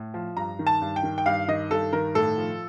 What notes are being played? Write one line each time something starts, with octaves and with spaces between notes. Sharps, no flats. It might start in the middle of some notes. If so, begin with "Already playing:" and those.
Already playing: A2
F3
G2 A#5
D#3
A5
G2
G5
D#3
G5
G2 F5
D#3 D#5
G2 A4
D#3 A#4
A2 A4
F3